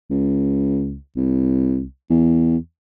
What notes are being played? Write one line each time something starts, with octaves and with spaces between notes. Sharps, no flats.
C#2
C2
E2